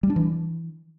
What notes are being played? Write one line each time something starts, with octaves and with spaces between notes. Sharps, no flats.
G3
D4
E3